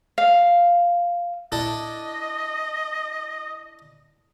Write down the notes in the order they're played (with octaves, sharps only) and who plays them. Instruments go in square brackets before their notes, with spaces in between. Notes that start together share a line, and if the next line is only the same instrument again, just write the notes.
[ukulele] F5
[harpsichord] D4 E4 A4 [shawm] D#5